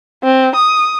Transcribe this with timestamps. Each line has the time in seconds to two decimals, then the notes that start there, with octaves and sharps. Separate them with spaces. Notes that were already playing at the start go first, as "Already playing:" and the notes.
0.23 C4
0.55 D#6